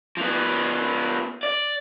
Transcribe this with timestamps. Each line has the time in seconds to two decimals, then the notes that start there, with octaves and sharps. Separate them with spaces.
0.17 F3 B3
1.43 D5